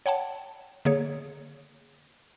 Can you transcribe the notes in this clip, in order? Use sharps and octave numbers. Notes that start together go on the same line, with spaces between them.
C#5 F#5 G5 A5
D3 A#3 G#4 C#5